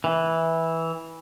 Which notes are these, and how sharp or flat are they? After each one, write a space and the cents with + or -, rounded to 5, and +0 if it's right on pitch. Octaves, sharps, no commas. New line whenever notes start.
E3 -10